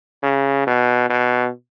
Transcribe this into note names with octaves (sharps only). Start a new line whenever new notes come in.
C#3
B2
B2